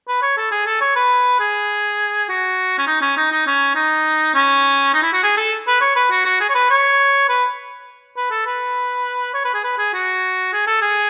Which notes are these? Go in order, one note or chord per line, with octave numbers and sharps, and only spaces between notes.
B4
C#5
A4
G#4
A4
C#5
B4
G#4
F#4
C#4
D#4
C#4
D#4
D#4
C#4
D#4
C#4
D#4
E4
F#4
G#4
A4
B4
C#5
B4
F#4
F#4
G#4
C#5
B4
C#5
B4
B4
A4
B4
C#5
B4
G#4
B4
G#4
F#4
G#4
A4
G#4